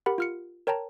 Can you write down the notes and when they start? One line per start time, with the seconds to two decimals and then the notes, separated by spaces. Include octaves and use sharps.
0.06 G4 A#4 F#5 B5
0.18 F4 F6 C#7
0.67 A#4 C#5 G5 A5 A#5